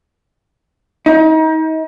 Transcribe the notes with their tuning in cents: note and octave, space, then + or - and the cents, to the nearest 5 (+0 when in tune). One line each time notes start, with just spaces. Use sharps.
D#4 +35